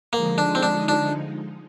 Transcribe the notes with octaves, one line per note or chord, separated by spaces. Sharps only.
D3 F3 G#3 A#3 D#4
D4
C4
D4
D4